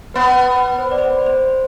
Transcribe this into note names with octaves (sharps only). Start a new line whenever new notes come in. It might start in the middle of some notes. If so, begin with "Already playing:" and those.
B3 B4
B4
B4
C5
D5
C5
C5